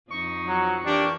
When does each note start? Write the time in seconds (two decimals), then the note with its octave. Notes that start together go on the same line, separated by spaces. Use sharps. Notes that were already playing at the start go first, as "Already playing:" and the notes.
0.11 F2 F3 D#4 C#6
0.47 F#3
0.86 E3 A#3 D4 G4